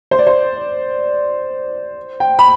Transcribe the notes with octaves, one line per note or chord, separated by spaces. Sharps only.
C5
D5
C5
G5
B5